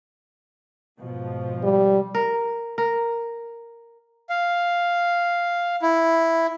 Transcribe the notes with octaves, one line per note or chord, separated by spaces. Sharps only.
G#2 B2 F3
G3
A#4
A#4
F5
E4